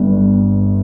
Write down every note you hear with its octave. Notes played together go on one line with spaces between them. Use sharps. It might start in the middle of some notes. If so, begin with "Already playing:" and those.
Already playing: G1 G2